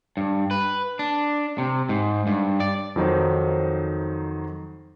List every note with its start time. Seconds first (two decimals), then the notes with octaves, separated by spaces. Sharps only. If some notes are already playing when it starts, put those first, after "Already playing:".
0.17 G2
0.51 B4
0.99 D4
1.58 C3
1.89 G#2
2.27 G2
2.60 D5
2.96 F2 D#3 F#3 D#4 C5